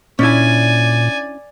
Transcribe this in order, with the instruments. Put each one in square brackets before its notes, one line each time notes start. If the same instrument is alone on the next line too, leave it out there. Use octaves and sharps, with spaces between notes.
[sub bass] A#2 [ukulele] C#4 D4 E4 [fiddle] D5 G#5